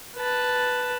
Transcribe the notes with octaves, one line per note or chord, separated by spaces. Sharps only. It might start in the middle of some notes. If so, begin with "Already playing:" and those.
B4 A5